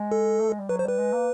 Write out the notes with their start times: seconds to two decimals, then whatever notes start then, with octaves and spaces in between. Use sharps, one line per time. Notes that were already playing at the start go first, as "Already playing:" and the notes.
Already playing: G#3
0.12 A4
0.40 A3
0.49 G#3
0.59 G3
0.69 F#3 B4
0.79 C5
0.84 G3 B4
0.99 G#3
1.13 A#3